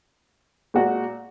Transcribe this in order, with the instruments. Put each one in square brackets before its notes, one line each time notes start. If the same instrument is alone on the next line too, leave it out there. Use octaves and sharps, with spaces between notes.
[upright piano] A#2 G#3 F#4